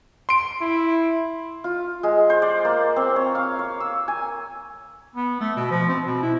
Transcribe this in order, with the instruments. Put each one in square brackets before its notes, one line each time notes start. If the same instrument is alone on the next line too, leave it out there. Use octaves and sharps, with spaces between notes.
[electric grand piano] C6 D7
[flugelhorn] E4
[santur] F4
G#3
C5
D5
A#3
C4
C#5
F5
C#5
E6
G#5
[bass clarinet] B3
A3
B2
F3
C4
B2
E4